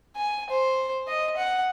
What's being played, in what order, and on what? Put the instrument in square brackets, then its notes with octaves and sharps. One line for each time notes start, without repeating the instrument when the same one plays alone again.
[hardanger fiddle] G#5
C5
D#5
F#5